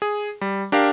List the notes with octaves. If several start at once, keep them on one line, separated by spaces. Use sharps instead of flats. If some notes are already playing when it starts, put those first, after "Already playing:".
G#4
G3
D4 G4 A#4 F5